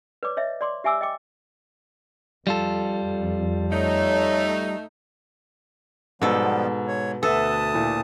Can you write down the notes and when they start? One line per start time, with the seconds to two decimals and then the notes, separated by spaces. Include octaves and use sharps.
0.23 B4 C#5 D5 D6
0.37 C#5 D#5 E5
0.61 D5 C6 D6
0.84 G4 E5 G#5 D6 E6
1.01 D#5 G5 D6
2.47 F2 G3 F4 A4
3.71 A3 D#4 C#5
6.22 G#2 B2 F3 G3 B3 A4
6.87 C#5
7.23 D2 A4 B4 E5 F#5 A5 D#6
7.74 A#2 E4